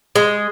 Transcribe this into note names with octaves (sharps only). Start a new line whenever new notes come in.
G#3